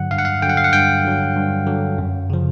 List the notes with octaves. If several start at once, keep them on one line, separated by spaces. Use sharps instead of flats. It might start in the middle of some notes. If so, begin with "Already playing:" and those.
Already playing: G2 D3 F#3 F#5
G2 F5
F#5
F5
D3 F#3 F#5 G5
F5
F#5
G2 G5
D3 F#3
G2
D3 F#3
F#2
C#3 F3